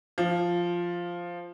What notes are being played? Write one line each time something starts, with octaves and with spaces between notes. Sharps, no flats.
F3